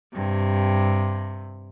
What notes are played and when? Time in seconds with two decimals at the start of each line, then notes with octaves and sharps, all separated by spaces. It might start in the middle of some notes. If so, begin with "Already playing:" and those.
0.14 G2 C3